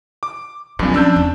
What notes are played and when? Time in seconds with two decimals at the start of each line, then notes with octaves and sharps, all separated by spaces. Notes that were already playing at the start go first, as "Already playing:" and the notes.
0.23 D6
0.79 G2 A#2 F3 F#3 C4
0.94 C#4 D4 E6 G6
1.16 E2